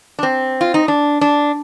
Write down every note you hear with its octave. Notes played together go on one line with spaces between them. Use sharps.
D4
C4
F4
D#4
D4
D4